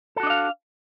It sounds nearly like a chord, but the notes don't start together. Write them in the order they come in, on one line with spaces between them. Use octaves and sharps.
A4 F#4 D4 D#5 F5